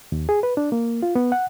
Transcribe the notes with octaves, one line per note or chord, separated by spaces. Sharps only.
D#2
G#4
B4
D4
A#3
F4
B3
F#5